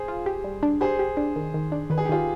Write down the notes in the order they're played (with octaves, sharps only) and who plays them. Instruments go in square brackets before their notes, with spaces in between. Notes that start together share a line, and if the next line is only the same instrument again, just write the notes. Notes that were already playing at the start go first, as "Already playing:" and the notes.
Already playing: [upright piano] G#4 C5
[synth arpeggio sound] F4
G4
G3
D4
[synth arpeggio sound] G4 [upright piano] G#4 C5
[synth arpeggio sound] G4
D4
D#3
D#3
D4
[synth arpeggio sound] D#3 [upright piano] B4
[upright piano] G#4
G4
[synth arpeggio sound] D#3 [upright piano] F4 G#4